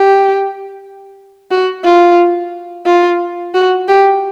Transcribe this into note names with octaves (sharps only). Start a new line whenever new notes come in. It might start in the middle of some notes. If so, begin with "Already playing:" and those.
Already playing: G4
F#4
F4
F4
F#4
G4